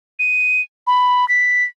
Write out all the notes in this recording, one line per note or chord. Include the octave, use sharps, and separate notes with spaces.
D#7
B5
B6